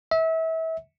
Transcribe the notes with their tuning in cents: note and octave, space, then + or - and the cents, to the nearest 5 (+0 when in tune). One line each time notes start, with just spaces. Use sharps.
E5 -30